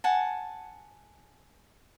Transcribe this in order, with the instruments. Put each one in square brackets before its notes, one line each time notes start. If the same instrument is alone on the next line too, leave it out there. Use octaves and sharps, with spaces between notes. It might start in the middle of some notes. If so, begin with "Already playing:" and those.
[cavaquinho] F#5 G#5 A5